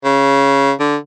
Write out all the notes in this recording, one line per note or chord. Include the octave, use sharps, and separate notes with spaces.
C#3
D3